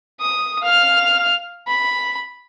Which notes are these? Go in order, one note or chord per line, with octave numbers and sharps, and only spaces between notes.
D#6
F5 F6
B5